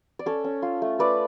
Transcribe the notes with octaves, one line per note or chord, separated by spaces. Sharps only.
D5
C#4 A4 C#5
C#4
F4
A3
A3 B4 D5